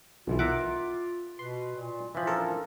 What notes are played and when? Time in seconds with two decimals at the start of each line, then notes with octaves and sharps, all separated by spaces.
0.27 B1 B2 E3 F4
0.39 A#4 E5 F#5 D6
1.39 B2 B4 C6
1.76 A#2
2.15 E3 F3 B5
2.27 C#4 D4 A4 A#4